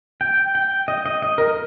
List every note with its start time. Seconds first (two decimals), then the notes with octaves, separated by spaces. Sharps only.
0.21 G5
0.55 G5
0.88 D#5
1.06 D#5
1.22 D#5
1.38 A#4